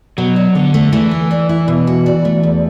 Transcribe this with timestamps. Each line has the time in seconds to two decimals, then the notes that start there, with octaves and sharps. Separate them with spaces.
0.18 B2 F#3
0.36 D4
0.55 D3 A4
0.74 A3
0.93 E3 A3
1.11 B4
1.31 D5
1.49 E4
1.68 B2
1.87 F#4
2.06 D5
2.25 A3
2.43 E2